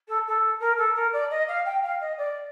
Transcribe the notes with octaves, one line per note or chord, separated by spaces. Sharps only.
A4
A4
A#4
A4
A#4
D5
D#5
F5
G5
F5
D#5
D5